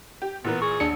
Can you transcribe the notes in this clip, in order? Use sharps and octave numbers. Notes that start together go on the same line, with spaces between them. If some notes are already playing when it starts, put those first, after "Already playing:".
G4
A#2 E3 B3 A#4
G#4 C#6
A1 D#2 D4 C#7